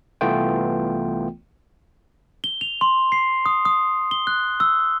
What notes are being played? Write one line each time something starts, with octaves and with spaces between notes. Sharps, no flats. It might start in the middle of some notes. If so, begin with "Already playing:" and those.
C2 E3 A3 B3 F4 G5
G7
F7
C6
C7
D#6
D#6
G7
F#6
E6